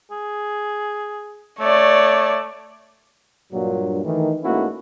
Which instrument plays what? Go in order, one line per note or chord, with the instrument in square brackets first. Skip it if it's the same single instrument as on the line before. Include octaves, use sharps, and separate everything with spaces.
[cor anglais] G#4
[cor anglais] A3 [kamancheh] C#5 D5
[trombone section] G2 A#2 F#3
D#3 E3 A3
G#2 A3 A#3 C#4 E4 F#4